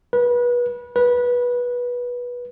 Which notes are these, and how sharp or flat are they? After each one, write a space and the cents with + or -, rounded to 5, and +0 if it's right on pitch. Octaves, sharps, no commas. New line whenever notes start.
B4 -30
B4 -20